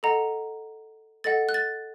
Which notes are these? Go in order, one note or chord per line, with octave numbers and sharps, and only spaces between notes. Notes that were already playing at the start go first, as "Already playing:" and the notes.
A4 D#5 F#5 A#5
A4 D#5 F#5 A6
F#6
A6